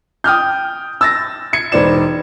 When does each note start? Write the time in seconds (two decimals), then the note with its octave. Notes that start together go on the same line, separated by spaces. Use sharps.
0.24 G5 D#6 F6 G6
1.01 E6 A6 A#6
1.53 G#6 C#7
1.72 E1 D#4 B4 C5 D5 E7